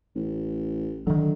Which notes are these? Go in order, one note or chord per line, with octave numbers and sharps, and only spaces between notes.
A1
D3 D#3 F#3